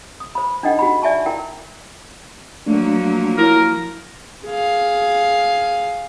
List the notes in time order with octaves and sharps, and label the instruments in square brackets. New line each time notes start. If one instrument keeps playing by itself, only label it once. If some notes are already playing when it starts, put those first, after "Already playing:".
[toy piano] D#6
C5 B5
D4 D#4 A4 D#5 F#5 G5
F#4 G#4 G5 B5
D5 E5 G#5 A5 C#6
E4 A#4 G5
[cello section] F3 F#3 A#3 [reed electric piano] A3 D4
[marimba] E4 C#5 [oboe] A#4
[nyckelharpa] G#4 F5